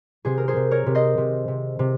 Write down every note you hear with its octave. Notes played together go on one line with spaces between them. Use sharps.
C3 G#4 C5
A#4
G#4 C5
C3
A#4 C#5
C3
C5 D#5
C3
C3
C3